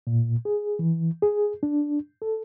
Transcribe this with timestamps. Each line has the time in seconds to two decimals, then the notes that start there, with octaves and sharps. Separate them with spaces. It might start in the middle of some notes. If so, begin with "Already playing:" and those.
0.07 A#2
0.45 G#4
0.79 E3
1.22 G#4
1.63 D4
2.22 A4